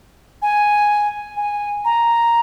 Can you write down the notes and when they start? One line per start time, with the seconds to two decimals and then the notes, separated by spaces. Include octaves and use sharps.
0.42 G#5
1.37 G#5
1.85 A#5